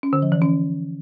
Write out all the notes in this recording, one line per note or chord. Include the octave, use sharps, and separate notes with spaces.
C#4
D3
F3
E3
C#4